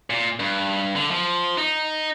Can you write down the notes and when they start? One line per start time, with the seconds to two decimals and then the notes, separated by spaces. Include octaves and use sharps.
0.10 A#2
0.40 G2
0.95 D3
1.11 F3
1.58 D#4